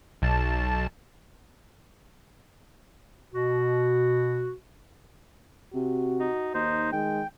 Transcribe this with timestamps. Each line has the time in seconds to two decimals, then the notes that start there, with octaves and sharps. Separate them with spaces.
0.22 B1 A5
3.33 B2 F#4
5.74 C3 F#4
6.20 D#4
6.54 D#2 D#4 C5
6.92 D#3 G#3 G5